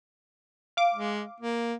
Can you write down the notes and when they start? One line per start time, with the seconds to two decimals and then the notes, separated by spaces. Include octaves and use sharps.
0.77 F5 D6
0.94 G#3
1.40 A#3